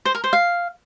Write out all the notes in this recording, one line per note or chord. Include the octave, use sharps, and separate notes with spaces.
C5
A#4
C5
F5